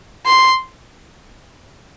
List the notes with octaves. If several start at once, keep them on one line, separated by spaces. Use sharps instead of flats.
C6